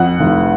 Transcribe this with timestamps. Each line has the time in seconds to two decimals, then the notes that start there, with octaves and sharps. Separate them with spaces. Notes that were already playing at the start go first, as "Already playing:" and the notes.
Already playing: F2 F#5
0.20 F1